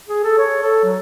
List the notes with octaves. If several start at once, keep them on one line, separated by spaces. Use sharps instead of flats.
G#4
A4
C#5
A4
F#3